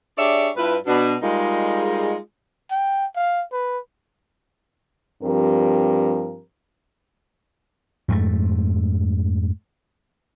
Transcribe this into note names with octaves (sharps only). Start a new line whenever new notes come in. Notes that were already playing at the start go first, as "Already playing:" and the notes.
D4 G4 G#4 C#5 D5 E5
G2 E4 F4 B4
B2 D4
G3 G#3 A#3 D#4 F4 G#4
G5
F5
B4
G2 F3 C4 G4 A#4
F2 G#2 A3